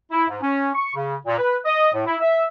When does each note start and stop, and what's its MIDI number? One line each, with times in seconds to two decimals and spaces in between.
0.11 0.27 64
0.29 0.38 44
0.42 0.70 61
0.75 0.92 85
0.95 1.15 49
1.26 1.36 46
1.38 1.57 71
1.66 1.90 75
1.93 2.04 45
2.07 2.16 64
2.21 2.45 76